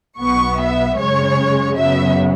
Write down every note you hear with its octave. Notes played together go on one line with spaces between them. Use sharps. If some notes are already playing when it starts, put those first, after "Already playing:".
B1 B2 B3 C#6
E5
F#2 C#3 G#3 C#5
F#2 C#3 F#3 B3 E5